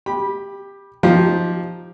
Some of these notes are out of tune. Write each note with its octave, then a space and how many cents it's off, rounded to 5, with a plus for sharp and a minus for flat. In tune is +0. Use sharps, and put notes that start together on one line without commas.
G4 +15 B5 -15
F3 +0 D#4 +0 G4 +0